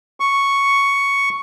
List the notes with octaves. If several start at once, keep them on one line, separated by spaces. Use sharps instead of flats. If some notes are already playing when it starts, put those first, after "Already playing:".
C#6